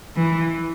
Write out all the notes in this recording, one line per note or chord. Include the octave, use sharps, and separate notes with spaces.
E3